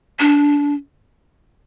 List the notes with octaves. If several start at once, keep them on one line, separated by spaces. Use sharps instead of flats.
D4